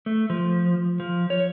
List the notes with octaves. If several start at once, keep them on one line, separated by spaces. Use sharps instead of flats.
A3
F3
F3
C#5